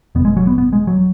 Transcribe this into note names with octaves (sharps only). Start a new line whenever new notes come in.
F#1 E2 B2 B3
G#3
F#3
B3
B3
G#3
F#3